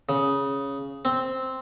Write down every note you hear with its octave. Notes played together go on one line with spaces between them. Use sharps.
C#3
C4